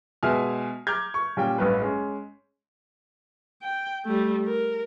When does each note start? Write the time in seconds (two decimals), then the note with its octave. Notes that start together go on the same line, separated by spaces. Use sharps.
0.23 B2 G#3 E5 G#5 F6
0.87 A#5 D6 F6 G6 G#6
1.14 C#6
1.37 A#2 G3 C#4 G5
1.58 A1 G2 B4
1.81 G#3 C#4
3.62 G5
4.05 G3 A3
4.46 A#4